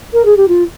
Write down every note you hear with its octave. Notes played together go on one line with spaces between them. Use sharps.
A#4
G#4
G4
F4